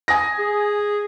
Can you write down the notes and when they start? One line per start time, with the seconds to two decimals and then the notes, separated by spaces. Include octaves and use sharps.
0.08 G#5 D#6 A#6
0.39 G#4